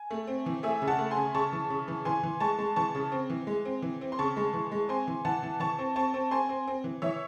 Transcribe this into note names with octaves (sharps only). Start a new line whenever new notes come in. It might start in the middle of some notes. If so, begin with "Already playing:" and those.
Already playing: G#5
A3
C4
E3
A3 E5 G#5
C#3
F#5 A5
A3
G#5 C6
C#3
C#3 A5 C#6
E3
C#3
E3
E3 G#5 C6
E3
G#3 A5 C#6
G#3
E3 A5 C#6
C#3
C4
E3
G#3
C4
E3
C4
C6
C#3 A5 C#6
G#3
E3
G#3
C4 G#5 C6
E3
E3 F#5 A5
E3
E3 A5 C#6
C4
C4 A5 C#6
C4
C4 G#5 C6
C4
C4
E3
E3 C#5 E5